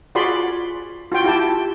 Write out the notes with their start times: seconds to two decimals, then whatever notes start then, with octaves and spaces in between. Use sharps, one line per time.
0.15 F4 F#4 G#4 D5 B5 C6
1.12 F4 F#4 G5
1.24 E4 G4 G5 A5